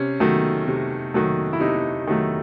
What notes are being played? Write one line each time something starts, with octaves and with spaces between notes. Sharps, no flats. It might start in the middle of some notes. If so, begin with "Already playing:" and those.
Already playing: C3 C#4
D#3 F#3 A3
C3
D#3 F#3 A3
E4
C3 D#4
D#3 F#3 A3